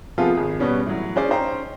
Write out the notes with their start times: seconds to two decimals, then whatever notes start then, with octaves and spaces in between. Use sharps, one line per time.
0.18 C3 F3 B3 F4 G#4 A4
0.35 G#1 G#4
0.60 B2 G3 B3 C#4
0.86 A2 E3 F#3
1.16 C#4 G#4 C5 D5
1.29 C#4 D#4 C5 G5 A#5